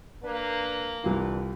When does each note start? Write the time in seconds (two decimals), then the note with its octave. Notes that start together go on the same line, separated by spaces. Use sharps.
0.24 A#3 D4 B4
1.04 C2 D3 E3 F4